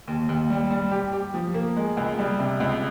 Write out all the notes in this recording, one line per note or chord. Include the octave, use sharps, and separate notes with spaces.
D#2
D#2
G3
G3
G4
G4
F3
A#3
G#3
C#2
G3
C3
C#2